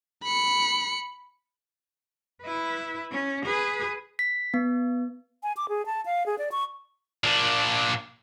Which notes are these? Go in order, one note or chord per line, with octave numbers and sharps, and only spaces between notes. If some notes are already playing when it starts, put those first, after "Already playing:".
B5 C#7
E4 B4
C#4
G#4 B4
B6
B3
G#5
D6
G#4
A5
F5
G#4
D5
C#6
A#2 D4